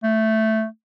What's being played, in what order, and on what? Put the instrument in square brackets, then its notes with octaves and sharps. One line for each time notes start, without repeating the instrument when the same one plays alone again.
[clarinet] A3